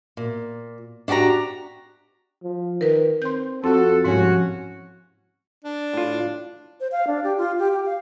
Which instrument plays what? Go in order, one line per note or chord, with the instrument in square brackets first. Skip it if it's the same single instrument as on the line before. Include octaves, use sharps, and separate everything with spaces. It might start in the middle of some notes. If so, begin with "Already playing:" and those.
[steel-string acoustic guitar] A#2
D4 F#4 G4 F#5 A#5
[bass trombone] F3
[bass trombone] D#3 [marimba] A#4 B4
[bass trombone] C4 [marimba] C6 G6
[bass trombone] F2 [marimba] C4 [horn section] F#4 A4
[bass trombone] C2 [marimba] G#2 F3 G#3 [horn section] C#4 F#4
[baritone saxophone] D4
[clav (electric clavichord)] A2 F4
[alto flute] C5
F5
D4
G4
F4
G4
G4
F5